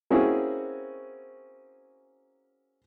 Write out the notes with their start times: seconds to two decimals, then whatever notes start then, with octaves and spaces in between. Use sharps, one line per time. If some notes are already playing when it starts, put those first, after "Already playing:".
0.10 A#3 C4 C#4 E4 F#4 G#4